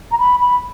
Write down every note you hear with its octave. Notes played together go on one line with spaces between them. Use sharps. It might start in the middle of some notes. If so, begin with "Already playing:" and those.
A#5
B5
B5